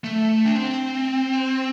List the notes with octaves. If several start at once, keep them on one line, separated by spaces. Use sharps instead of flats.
A3
D4
C4